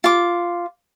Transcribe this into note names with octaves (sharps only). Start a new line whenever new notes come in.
F4 D6